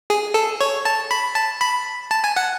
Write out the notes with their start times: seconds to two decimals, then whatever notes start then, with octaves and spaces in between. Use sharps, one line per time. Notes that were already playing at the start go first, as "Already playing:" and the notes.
0.10 G#4
0.34 A4
0.61 C#5
0.85 A5
1.11 B5
1.35 A5
1.61 B5
2.11 A5
2.24 G#5
2.36 F#5